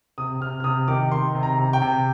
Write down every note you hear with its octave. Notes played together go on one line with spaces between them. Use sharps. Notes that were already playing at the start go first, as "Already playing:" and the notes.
C3 D#6
C3 F6
F6
C3 D#6
D#3 D6
D#3 C6
C3
A#5
C3
G5
C3